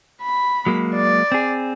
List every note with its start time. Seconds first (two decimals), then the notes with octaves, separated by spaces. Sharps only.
0.22 B5
0.66 F#3 G#3 A#3
0.96 D5
1.32 C4 G#4